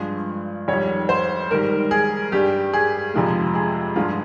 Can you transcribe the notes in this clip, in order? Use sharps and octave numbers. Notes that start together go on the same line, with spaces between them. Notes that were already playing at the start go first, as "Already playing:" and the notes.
Already playing: G2 F3 G#3
F2 D#3 G3 C#5
C5
G#2 D#3 G3 A#4
G#4
G2 G3 G4
G#4
F2 C3 F3 G#3
G#4
G2 F3 G#3 F4